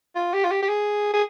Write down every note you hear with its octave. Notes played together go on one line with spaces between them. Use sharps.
F4
G4
F4
G4
G4
G#4
G#4